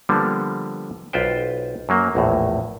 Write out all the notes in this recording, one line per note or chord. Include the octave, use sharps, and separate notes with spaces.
D3 F3 G3 A#3 B3
B1 F4 B4 C5 G5
F#2 F#3 A#3
A#1 E2 A2